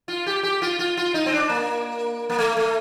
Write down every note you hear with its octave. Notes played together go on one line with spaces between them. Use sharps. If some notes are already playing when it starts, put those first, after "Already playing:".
F4
G4
G4
F4
F4
F4
D#4
C4
D4
A#3
A#3
A3
A3